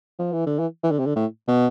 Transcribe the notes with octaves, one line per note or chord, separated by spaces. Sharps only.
F3
E3
D3
E3
E3
D3
C3
D3
A2
B2